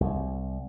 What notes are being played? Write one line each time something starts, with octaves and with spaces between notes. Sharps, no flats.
C2